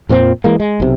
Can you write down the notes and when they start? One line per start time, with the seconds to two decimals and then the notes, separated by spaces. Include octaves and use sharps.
0.09 F2 A#2 F3 C4
0.44 E3 G#3 A#3
0.60 G#3
0.80 B1 C3